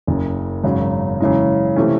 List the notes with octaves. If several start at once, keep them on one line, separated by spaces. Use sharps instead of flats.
F#1 F#2 C#3
G#1 F#2 C#3 F#3
F#2 C#3 E3 G#3
C3 E3 A3 C#4